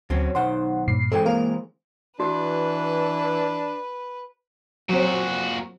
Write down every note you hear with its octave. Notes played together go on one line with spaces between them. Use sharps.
D2 F#3 C4 C#4
B1 D#3 C5 F#5 C6
G2 A#2 C7
E3 G#3 C4 A4 G5
A#3 A#4 F5
E3 D4 F#4 B4
A#2 F#3 C4 F#4